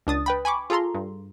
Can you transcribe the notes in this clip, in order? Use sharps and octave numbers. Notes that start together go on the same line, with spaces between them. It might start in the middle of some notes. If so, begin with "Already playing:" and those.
C#2 D4 D#6 A6
B4 G5 B5
G#5 B5 C#6 D6
F4 G#4 A4 A#5 C6
G2